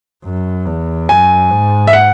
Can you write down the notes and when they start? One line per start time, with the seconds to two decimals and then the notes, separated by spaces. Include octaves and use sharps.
0.25 F#2
0.66 E2
1.09 F#2 G#5
1.51 G#2
1.87 E5
1.93 F#5